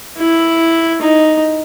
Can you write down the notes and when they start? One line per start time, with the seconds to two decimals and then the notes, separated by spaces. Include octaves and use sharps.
0.17 E4
1.02 D#4